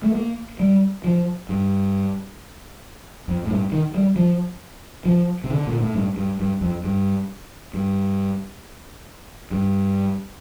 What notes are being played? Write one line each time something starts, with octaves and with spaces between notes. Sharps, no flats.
A3
A#3
G3
F3
G2
F2
A2
G2
D#3
G3
F3
F3
C3
D3
A#2
A2
G2
G2
G2
F2
G2
G2
G2